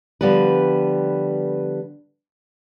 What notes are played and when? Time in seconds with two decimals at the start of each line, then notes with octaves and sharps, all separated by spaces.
0.21 D3 F3 G3 B3 B4